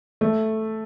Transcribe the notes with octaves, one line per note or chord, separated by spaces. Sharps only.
A3